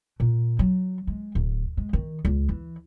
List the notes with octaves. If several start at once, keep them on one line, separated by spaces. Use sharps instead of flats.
A#2
F#3
G#3
D1
G#3
D#3
C#2
E3